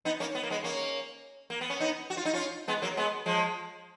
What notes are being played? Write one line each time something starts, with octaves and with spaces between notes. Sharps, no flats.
B3 D#4
A#3 C#4
B3
A#3
G#3 B3
A#3 C#4
A#3
B3
C#4
B3 D#4
F#4
F4
D#4
C#4 F4
G#3 B3
F#3 A#3
G#3 B3
F3 G#3